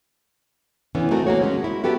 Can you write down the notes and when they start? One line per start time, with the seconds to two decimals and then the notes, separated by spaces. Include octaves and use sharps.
0.95 D3 E3 B3 C#4
1.11 A3 C4 D#4 F#4 A#4
1.27 A#3 F#4 C#5
1.42 G#3 C#4 F#4
1.64 E4
1.84 B3 F#4 G4 A4 B4